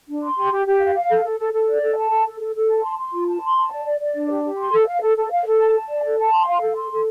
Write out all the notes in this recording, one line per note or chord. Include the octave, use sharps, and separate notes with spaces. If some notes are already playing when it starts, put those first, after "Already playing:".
D4
C6
G4
G4
G4
F5
F5
A4
A4
A4
A4
D5
A4
A5
A4
A4
A4
A4
A5
C6
C6
F4
A5
C6
A5
D5
D5
D5
D4
G4
G4
C6
A4
F5
A4
A4
F5
A4
A5
A5
D5
A4
A5
C6
F5
A4
C6
A4